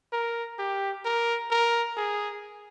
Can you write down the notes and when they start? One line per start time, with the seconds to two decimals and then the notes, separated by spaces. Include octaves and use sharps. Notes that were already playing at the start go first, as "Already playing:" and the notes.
0.12 A#4
0.59 G4
1.05 A#4
1.51 A#4
1.97 G#4